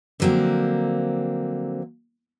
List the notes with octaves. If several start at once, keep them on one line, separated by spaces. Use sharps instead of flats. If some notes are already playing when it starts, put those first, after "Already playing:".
D3 F3 F#3 A#3 C4